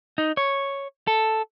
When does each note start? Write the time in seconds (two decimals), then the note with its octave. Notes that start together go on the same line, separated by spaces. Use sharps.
0.18 D#4
0.37 C#5
1.07 A4